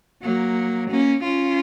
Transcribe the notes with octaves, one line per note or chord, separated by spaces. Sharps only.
F#3 A#3
A#3 C#4
C#4 F4